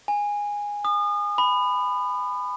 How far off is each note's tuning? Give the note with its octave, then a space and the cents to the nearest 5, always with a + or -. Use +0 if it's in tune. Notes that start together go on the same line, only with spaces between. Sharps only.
G#5 -10
D#6 -35
B5 +20